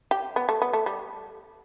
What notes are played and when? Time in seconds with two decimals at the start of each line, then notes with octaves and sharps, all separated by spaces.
0.11 G4
0.36 B3
0.49 A3
0.62 B3
0.73 A3
0.86 G3